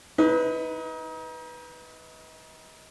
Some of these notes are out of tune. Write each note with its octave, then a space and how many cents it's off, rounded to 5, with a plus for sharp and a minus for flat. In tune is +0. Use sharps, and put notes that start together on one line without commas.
D#4 +30 B4 +0